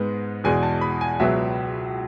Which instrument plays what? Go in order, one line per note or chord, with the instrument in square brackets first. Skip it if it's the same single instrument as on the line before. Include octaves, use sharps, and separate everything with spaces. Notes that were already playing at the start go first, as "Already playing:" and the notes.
Already playing: [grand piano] G#2 G#3 B3
E2 B2 G#3 G#5
A5
B5
G#5
C#2 B2 F#3 B3 E5